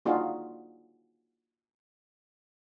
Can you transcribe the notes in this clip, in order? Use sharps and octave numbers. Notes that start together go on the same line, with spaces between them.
A#3 D4 D#4 F4 F#4 G#4